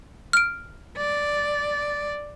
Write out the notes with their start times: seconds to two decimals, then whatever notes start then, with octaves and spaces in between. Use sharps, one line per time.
0.33 F6 D7
0.97 D5